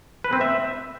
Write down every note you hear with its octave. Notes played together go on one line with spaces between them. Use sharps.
B4
C4
E5